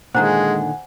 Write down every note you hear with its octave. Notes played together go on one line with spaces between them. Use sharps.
A#2 D3 D#3 G#3 C5 F#5 G#5 A#5